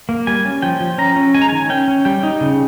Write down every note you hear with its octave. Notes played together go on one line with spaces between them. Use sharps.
A#3
G3 G#5
C#4
F3 G5
F3
C#4 A#5
C#4
G#3 G#5
A#5
D#3 G#5
C#4 G5
C#4
G3 G5
D#4
C#3